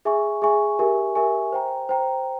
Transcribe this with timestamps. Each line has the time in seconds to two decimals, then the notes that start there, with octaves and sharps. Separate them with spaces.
0.05 G#4 E5 G#5 C#6
0.42 G#4 E5 G#5 C#6
0.79 G4 A#4 E5 G#5 C#6
1.15 G4 A#4 E5 G#5 C#6
1.52 C5 G5 A#5
1.89 C5 G5 A#5